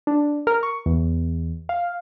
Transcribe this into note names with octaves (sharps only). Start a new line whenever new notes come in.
D4
A#4
C#6
E2
F5